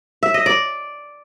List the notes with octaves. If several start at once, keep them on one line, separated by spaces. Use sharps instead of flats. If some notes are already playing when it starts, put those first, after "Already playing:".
E5
D#5
D5